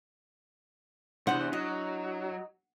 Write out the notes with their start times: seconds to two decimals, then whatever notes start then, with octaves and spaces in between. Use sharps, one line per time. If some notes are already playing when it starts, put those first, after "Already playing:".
1.27 E2 C3 B3 D4 E4 C5 F#5
1.53 F#3 D#4